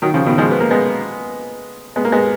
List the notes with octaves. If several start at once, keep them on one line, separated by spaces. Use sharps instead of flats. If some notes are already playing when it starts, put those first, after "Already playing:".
D#3 F#3
C#3 F3
B2 D#3
F3 G#3
B3
A#3
G#3 B3
G#3 B3
A#3
G#3 B3